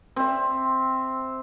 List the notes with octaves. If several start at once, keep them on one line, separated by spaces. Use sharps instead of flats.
C4 E5